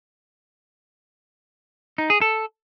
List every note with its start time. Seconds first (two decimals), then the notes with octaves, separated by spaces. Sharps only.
1.98 D#4
2.10 G#4
2.22 A4